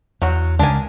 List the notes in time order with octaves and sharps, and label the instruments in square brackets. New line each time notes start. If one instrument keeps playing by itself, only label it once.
[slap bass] E2 [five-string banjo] F#3 F#4
[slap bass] C#2 C#3 [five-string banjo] D4 A#4 G#5